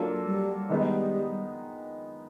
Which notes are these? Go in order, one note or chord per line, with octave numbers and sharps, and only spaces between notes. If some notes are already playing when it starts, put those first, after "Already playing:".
Already playing: F#3 A#3 D4 F4 A4
G3
D#3 G3 G#3 B3 D#4